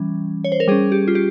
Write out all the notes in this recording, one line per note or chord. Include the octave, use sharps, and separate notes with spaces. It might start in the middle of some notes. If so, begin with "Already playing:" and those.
Already playing: E3 G3 C#4
C#5
C5
A#4
G3 C#4 G#4
G4
F4
G4